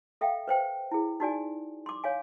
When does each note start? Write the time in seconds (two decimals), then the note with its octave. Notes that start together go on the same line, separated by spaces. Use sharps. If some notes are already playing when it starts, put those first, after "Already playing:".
0.21 A4 E5 F5 G5
0.48 B4 C5 G5
0.91 E4 G#4
1.20 D#4 F#4 D5 G#5
1.86 C6 D6
2.04 C#5 F5 G#5